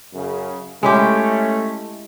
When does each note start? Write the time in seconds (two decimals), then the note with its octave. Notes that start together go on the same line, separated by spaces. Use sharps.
0.13 F#2 C#3
0.83 G#3 A3 C#4 E4 G4